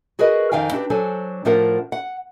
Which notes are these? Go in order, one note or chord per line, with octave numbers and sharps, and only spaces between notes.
F#4 G#4 A#4 B4 D#5
F2 D#3 F5 G5 G#5
C4 D4 F#4 G4 B4
F#3 D4 A4 C5 G#5
A2 F3 D4 F4 A#4 F#5
F#5